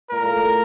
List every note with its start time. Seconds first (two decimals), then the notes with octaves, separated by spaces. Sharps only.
0.11 A#2 A#4
0.23 A2
0.36 A2